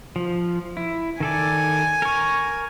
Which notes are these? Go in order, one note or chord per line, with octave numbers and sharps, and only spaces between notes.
F3
E4
D#3 A4 D5 G#5
A#4 C#6